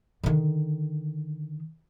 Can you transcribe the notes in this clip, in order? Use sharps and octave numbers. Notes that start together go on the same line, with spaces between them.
D3 D#3